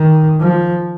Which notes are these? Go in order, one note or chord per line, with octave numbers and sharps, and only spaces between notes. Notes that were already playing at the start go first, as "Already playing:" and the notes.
Already playing: D#3
F3